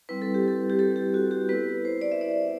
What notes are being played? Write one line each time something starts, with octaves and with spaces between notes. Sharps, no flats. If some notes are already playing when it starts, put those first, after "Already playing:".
G3 C4 E4 B4
A4
G4
A4
G4
A4
G4
F#4
G4
B3 E4 B4
C5
D5
E5
D5